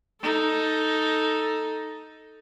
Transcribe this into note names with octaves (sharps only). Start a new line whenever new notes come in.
D#4 A4